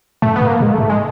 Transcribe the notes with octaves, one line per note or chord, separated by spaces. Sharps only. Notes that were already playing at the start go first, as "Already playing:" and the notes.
G#2 A3
G#2 B3
A#3
A2 G#3
A3
G#2
G#3